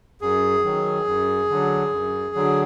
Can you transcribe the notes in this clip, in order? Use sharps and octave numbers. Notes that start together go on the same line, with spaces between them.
F#2 G#4
D#3 F#3
F#2
D3 F#3
F#2
D3 F#3